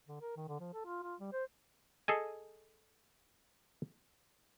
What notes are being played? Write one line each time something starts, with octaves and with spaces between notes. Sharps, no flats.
D3
A#4
D#3
D3
F3
A4
F4
F4
G3
C5
G#4 A4 D#5 G#5